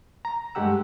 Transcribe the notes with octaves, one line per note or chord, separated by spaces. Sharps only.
A#5
G2 G#3 A3 G4 F#5 E6